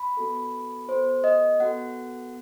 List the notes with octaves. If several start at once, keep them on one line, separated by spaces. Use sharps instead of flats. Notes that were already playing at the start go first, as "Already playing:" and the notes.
Already playing: B5
B3 F#4 A4
B3 F#4 A4 C5
D#5
B3 F#4 A4 F#5